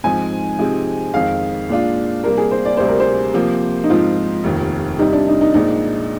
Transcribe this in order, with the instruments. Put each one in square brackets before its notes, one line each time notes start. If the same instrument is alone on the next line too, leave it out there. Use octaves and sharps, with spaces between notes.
[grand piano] G#2 F3 C4 D#4 [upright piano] G#5
[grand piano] C3 F3 G#3 C4 D#4
[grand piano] F2 D#3 G#3 [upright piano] F5
[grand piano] A#2 G#3 D4 F4
[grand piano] C3 G3 A#3 [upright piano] A#4
[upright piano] G#4
C5
D5
[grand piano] D2 C3 G3 [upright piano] C5
[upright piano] A#4
C5
[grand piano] C3 F3 A#3
[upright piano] D#4
[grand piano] G#2 F3 C4 [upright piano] F4
[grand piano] F1 D#2 D#3
[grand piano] C2 C3 G3 [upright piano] D#4
[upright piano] D4
D#4
D#4
[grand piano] A#1 A#2 G#3 D4 [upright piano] D#4